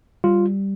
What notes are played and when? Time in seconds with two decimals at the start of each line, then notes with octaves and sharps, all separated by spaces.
0.24 G3 F4